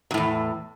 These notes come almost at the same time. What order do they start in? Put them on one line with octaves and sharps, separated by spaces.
C3 A2 E2